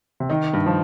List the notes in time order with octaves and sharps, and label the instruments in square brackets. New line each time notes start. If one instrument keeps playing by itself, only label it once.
[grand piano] C3
[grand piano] D#3 [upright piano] D#4
[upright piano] G2
[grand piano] F3